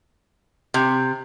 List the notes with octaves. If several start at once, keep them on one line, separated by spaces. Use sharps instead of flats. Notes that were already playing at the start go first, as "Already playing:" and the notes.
C3